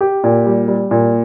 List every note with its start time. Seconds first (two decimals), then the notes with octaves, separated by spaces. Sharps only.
0.01 G4
0.24 A#2
0.46 G3
0.68 G3
0.91 A#2